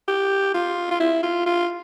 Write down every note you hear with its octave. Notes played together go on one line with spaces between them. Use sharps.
G4
F4
F4
E4
F4
F4